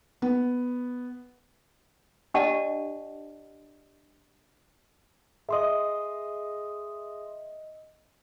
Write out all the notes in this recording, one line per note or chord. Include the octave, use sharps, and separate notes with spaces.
B3
D4 G4 D5 D#5 F#5 A5
G#4 D#5 E5 C6 D#6